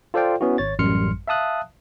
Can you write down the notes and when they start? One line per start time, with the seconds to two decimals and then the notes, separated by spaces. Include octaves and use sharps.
0.14 F4 A4 C5 D5 F5 G5
0.41 B3 C#4 E4 F#4
0.58 G#1 C#5 A6
0.79 A1 F#2 G3 C6 F6 C#7
1.28 E5 F5 A5 D#6 F#6